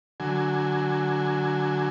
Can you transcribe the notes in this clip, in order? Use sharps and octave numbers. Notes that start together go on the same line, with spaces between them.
D3 F#3 G#5